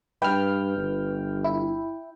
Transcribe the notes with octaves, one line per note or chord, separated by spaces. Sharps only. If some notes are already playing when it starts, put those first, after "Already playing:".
G2 B4 G5 F6
G1
E4